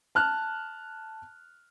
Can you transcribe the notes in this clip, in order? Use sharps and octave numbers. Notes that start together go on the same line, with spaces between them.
A5 F6 F#6